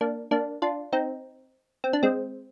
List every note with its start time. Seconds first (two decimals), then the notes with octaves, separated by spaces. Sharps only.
0.01 A#3 D4
0.31 A#3 D4
0.62 D4 F4
0.93 C4 D#4
1.84 C4
1.93 D4
2.03 G#3 C4